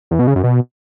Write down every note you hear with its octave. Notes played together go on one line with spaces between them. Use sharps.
E2
B2
C#3
F#2
B2